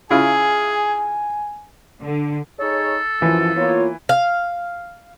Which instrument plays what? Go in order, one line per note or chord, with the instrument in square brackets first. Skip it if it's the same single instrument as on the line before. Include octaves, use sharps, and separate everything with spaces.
[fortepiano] C#3 E4 F4 [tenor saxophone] G#4 [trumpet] G#5
[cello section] D3
[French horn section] D#4 G#4 C#5 [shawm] A4
[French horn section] F#2 F3 [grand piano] E3
[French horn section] A#3 B3 F4 [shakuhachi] C#5
[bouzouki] F5